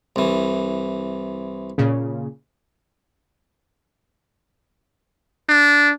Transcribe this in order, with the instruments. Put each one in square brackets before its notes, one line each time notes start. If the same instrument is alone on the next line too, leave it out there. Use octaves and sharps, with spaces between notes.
[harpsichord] C2 E3
[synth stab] A#2 C#3
[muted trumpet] D4